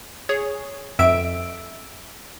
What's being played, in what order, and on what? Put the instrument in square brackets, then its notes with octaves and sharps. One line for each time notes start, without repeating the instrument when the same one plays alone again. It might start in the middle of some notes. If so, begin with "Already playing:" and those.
[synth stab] G#4 C#5
[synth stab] F2 D7 [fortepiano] E5